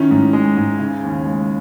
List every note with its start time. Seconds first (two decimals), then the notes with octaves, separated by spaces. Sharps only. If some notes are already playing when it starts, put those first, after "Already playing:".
Already playing: D#3 C#4 E4
0.11 G#2
0.33 G#3
0.57 G#2
0.79 C#3
1.03 D#2
1.26 G#3